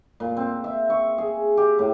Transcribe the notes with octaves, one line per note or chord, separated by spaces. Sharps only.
A#2
C4
E5
C#6
G#4
G4
A2